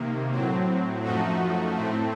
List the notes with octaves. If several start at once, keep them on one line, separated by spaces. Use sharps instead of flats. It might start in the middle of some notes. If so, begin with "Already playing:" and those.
Already playing: C3 D#3 A#3
A2 F#3 C4
F#2 F3 A3 D#4 F#4
A2 A3 C4